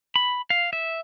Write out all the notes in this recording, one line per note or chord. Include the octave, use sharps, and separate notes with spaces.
B5
F5
E5